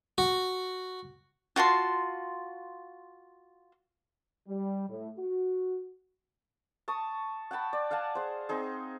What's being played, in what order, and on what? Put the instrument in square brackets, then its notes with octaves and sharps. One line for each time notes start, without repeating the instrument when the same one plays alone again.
[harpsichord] F#4
[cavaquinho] F4 F#4 A5 C6
[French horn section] G3
A2
F#4
[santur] A5 C#6 D#6
F#5 G5 A5 B5
D5
F5 F#5 G#5 A5
G#4 C5
C4 D#4 G#4